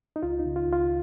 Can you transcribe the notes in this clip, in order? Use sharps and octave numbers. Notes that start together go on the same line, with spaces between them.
D#4
C#2 F4
D#4
C#3
F4
C#2
F4